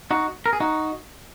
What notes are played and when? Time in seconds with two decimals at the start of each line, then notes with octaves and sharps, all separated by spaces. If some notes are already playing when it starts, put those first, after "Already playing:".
0.11 D#4 F#4
0.46 A#4
0.53 G#4
0.60 D#4 F#4